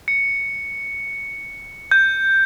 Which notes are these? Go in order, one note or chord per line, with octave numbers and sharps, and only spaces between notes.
C#7
G6